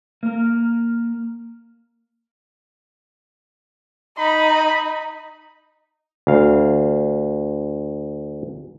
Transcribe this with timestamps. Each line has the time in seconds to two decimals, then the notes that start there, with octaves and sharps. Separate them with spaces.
0.23 A#3 A#4
4.18 D#4 B5
6.27 D2 F5